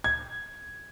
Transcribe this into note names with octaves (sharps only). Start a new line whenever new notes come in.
G#6